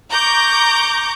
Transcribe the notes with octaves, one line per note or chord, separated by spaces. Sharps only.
A#5 C#6 D6 G6